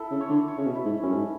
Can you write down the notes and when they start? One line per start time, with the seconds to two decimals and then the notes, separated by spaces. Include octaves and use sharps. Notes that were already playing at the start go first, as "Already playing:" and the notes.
Already playing: E4 A4
0.11 C#3
0.21 C#5
0.30 D3
0.48 C#5
0.58 C#3
0.66 B2
0.75 E4
0.85 G#2
1.03 F#2 C#4
1.12 G#2